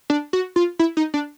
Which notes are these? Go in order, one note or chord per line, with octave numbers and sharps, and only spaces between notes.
D4
F#4
F4
E4
D#4
D4